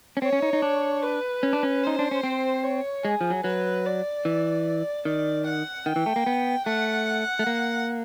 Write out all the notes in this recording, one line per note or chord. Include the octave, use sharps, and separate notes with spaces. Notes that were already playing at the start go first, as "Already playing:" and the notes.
C#4
C4 C#5
C#4
D#4
D#4
D4
B4
C#4
D4
C#4
D#4 C5
D4
C#4
C4
C#5
G#3 G#4
F3
F#3
F#3 B4
D5
E3
D#3 D5
F#5
D#3 G5
E3
A3
A#3
B3
A3 F#5
A3
A#3